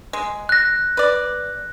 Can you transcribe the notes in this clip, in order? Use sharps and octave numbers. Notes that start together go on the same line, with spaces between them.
G#3
F#6 A#6
B4 D5